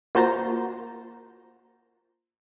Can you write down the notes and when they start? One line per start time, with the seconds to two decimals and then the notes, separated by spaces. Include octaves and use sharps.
0.15 A#3 F4 F#4 C5 A5 A#5